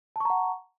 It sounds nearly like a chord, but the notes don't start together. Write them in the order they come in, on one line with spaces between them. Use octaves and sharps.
A5 C#6 A#5 F#5